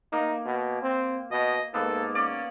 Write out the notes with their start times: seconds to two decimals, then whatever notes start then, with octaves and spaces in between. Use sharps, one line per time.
0.12 A#3 D#4
0.46 B2
0.82 C4
1.31 B2 D#5
1.74 G#2 A#3 B3 A4
2.15 C#4 D5